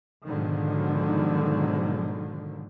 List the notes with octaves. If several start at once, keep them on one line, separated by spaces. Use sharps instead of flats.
G#2 B2 D3 D#3 F3 F#3